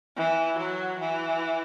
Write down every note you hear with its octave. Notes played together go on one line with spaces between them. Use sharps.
E3
F#3
E3